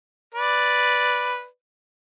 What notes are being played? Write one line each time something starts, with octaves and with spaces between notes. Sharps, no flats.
B4 D5